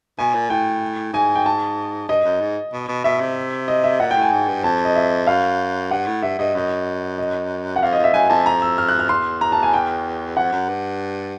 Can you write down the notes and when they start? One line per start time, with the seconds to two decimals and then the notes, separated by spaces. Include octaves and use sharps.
0.18 B2 G#5
0.34 A#2
0.50 A2 G5
1.13 G#2 G#5
1.35 G5
1.46 A5
2.09 G2 D#5
2.25 F#2
2.41 G#2
2.73 B2
2.89 B2
3.04 B2 E5
3.20 C3
3.68 D#5
3.84 E5
4.00 A#2 F#5
4.11 G5
4.16 A2
4.21 G#5
4.32 G#2
4.48 G2
4.64 F2 A5
4.85 D#5
4.96 E5
5.27 F#2 F5
5.91 G2 F#5
6.07 A2
6.22 G2 E5
6.39 G2 D#5
6.55 F#2 D#5
7.18 D#5
7.76 F#5
7.82 F2 F5
7.93 D#5
7.99 F2
8.04 E5
8.14 F#2 G#5
8.29 F2 A5
8.46 A#5
8.62 E6
8.78 F6
8.88 F#6
8.99 F6
9.09 E2 C6
9.41 A#5
9.52 A5
9.63 G#5
9.74 G5
10.37 F2 F#5
10.52 F#2
10.69 G2